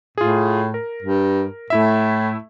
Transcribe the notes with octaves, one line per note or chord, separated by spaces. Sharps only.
A2 F4 G#4
A#4
G2
A2 A3 E4 E5